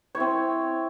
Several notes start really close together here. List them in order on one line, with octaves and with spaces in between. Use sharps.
C#5 E4 C4